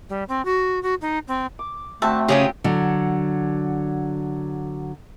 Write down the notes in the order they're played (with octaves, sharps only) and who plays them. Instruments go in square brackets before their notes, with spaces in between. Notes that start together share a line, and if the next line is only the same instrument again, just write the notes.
[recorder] G3
C4
F#4
F#4
D#4
C4
[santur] D6
[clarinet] A3 [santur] C4 F#4 [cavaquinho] E5 A5
[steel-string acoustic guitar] C#3 C#4 G#4 [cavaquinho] F4 G4 A#5
[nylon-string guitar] D3 F#3